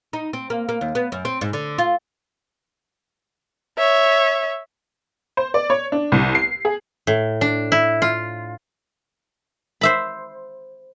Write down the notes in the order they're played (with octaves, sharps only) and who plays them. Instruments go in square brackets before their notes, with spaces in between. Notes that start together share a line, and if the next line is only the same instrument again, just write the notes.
[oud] D#4
C4
A#3
A#3
D#2
B3
F#2
C4
G#2
D3
F4
[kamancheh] C#5 E5
[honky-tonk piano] C5
D5
C#5
D4
C2
C7
G#4
[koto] A2
D4
E4
F4
[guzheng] C5 E5 B5